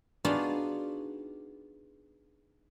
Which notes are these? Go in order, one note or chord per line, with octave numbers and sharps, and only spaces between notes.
B3 D4 D#4 F4 F#4 G#4